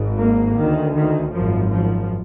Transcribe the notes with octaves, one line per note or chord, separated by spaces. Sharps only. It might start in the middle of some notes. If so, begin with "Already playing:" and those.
Already playing: G#1 G#2
A#3
D2 D#3
D#3
G#1 F#2 F3
F3